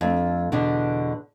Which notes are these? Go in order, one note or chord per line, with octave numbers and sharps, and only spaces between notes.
F2 A3 D4
E2 B2 D3 D4